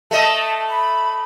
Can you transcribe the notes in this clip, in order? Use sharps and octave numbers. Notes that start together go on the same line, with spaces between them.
A3 D#5 A5
B5